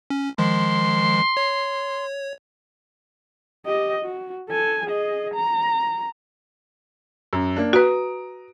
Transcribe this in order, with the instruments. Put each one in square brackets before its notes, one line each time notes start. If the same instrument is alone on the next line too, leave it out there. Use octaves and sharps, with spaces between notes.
[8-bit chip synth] C#4
[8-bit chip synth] D#3 F3 G#3 [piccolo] C6
[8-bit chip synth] C#5
[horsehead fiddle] G4 D#5
F#4
A4 G#5
G#4 D#5
A#5
[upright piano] F#2
A#3 D4
[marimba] F#4 B4 [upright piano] A#5 D#6 D7